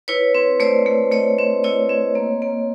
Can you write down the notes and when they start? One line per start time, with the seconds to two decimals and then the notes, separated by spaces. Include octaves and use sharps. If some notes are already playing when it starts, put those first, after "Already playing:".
0.08 E4 B4 C#5
0.35 C4
0.60 A3 C5 D5
0.86 A3
1.12 A3 C#5 D#5
1.39 C4
1.64 E4 C#5 D#5
1.89 C4
2.15 A#3
2.42 A#3